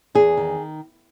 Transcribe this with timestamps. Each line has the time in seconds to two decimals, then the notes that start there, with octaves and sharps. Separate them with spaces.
0.15 E2 G#4
0.37 D#3